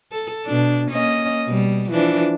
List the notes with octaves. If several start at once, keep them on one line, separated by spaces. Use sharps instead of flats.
A4
B2 D4
A#3 C#4 D#5
B2 G3
E3 F3 D4